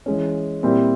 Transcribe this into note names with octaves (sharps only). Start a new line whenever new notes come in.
E3 G#3 C#4
A#2 G3 C4 E4